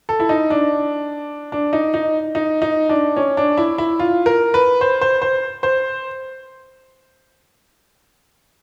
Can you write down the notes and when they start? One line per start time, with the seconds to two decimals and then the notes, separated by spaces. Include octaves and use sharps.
0.09 A4
0.20 E4
0.29 D#4
0.50 D4
1.52 D4
1.73 D#4
1.94 D#4
2.35 D#4
2.62 D#4
2.89 D4
3.16 C#4
3.37 D4
3.57 E4
3.78 E4
3.99 F4
4.26 A#4
4.54 B4
4.81 C5
5.01 C5
5.22 C5
5.63 C5